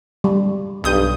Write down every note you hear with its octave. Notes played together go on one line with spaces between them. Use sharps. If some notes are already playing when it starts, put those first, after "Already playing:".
G3
B1 G2 D#6 G6